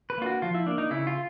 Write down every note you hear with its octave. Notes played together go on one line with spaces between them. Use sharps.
B4
A#3 D4 F4
F#4
F3 F4
E4
A#3 D4
D#4
C#3 E4
F4